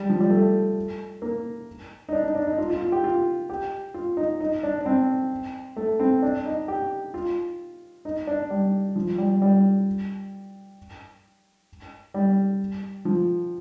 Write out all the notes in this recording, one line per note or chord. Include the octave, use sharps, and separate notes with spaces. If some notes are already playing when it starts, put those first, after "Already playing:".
Already playing: G3
F3
G3
A3
A#3
D#4
D4
D#4
D4
D#4
F4
F4
F4
G4
F4
G4
F4
D#4
D#4
D4
D4
C4
A3
C4
D4
D#4
G4
F4
D#4
D4
G3
F3
G3
G3
G3
F3